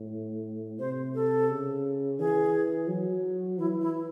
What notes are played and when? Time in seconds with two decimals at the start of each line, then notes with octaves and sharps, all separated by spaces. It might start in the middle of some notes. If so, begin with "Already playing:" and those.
Already playing: A2
0.79 C3 C5
1.15 A4
1.49 C#3
2.19 E3 G#4
2.88 F#3
3.58 E3 E4
3.81 E4